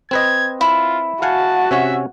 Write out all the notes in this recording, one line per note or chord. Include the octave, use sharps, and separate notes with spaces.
C4 B4 D#5 G#6
E4 F4
F#4 F5 F#5 G#5 A5
C3 C#4 C#5 E5